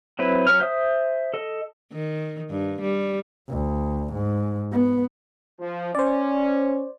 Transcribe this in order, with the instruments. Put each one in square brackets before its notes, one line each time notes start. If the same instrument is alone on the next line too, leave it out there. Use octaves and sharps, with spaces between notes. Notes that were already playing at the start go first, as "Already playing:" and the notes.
[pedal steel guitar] F#3 C4 E4 B4
F#3 C#4 F6
C5 E5 D#6
A4 D#5
[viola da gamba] D#3
G2
G3
[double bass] D2
G#2
B3
[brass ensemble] F3
[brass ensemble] C#4 [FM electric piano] C5 D5